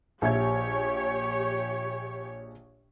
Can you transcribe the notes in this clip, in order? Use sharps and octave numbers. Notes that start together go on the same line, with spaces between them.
A#1 G4 C#5 E5 G#6